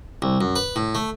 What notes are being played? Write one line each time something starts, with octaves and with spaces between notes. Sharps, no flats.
C2
F#2
B4
A2
A3